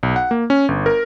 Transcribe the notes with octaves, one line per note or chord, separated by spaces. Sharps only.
B1
F#5
A#3
C#4
G1
A#4